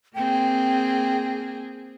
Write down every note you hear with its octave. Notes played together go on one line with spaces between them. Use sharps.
A#3 C4 G#4 G5